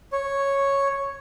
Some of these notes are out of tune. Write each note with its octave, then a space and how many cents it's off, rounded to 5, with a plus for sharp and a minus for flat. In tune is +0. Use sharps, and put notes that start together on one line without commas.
C#5 -5